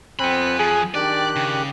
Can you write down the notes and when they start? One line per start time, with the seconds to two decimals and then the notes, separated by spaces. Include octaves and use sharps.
0.19 F2 C4 F#5 G#5 B5 F#6
0.59 F3 G#4
0.95 D#3 D4 G4 D5 F#6
1.36 C#3